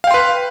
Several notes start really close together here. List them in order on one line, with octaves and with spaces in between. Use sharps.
F5 G5 C6 B4